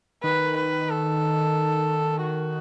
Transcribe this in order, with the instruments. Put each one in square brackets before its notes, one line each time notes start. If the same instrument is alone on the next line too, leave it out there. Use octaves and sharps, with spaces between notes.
[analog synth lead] D#3 [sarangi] B4
[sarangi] B4
A4
F#4